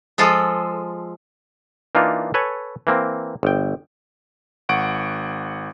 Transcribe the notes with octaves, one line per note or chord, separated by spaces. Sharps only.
F3 G#3 F4 A4
E3 A#3 D4 D#4 F4
A4 B4 C#5 G#5
E3 A#3 C4
G1 G5
G#1 F#5 C#6 D7